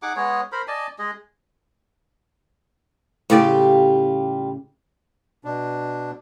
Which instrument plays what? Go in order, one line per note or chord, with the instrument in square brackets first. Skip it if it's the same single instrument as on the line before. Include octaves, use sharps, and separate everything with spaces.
[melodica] D#4 G#4 F#5 D6
G#3 B3 G#4 C#5
A#4 C5 B5
D5 D#5 G#5 A5
G#3 G#4 D#5
[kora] A2 C#3 D5 [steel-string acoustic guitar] G3 F4 G4
[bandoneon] B2 D4